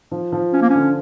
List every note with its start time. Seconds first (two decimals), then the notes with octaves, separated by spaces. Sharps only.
0.11 F3
0.32 F3
0.53 C#4 F4
0.62 A#3
0.70 C#4
0.75 D3